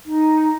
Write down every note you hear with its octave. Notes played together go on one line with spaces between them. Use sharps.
D#4